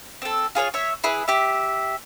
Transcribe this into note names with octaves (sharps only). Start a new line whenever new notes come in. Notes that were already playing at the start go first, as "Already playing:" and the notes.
C4 A4
F4 G#4 C#5 F5
C#5 E5
E4 G#4 B4
G4 E5